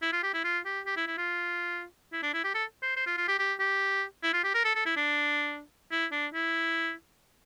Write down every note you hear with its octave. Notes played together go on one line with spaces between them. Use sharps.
E4
F4
G4
E4
F4
G4
G4
E4
E4
F4
E4
D4
E4
G4
A4
C5
C5
F4
F4
G4
G4
G4
E4
F4
G4
A#4
A4
A4
E4
D4
E4
D4
E4